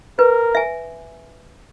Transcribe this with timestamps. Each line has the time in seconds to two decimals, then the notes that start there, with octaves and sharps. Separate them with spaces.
0.19 A#4 B4
0.55 E5 G#5